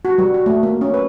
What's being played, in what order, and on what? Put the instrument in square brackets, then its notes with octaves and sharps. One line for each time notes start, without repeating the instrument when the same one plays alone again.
[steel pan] F#4
G3
F#4
A3
A#3
C#4
B4